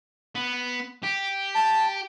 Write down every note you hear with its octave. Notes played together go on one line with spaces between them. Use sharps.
B3
G4
A5